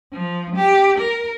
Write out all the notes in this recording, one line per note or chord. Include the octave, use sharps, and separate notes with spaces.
F3
G4
A#4